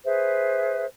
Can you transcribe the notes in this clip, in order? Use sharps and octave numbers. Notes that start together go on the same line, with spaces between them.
G#4 B4 C5 E5